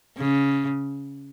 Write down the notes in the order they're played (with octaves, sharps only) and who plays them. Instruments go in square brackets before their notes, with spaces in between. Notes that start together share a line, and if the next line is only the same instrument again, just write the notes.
[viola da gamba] C#3